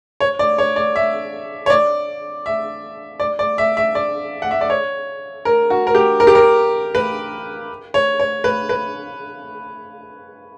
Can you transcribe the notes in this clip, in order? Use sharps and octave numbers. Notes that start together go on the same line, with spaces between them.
C#5
D5
C#5
D5
E5
C#5
D5
E5
D5
D5
E5
E5
D5
F#5
E5
D5
C#5
A#4
F#4
A#4
G4
A#4
G4
A#4
B4
C#5
C#5
B4
B4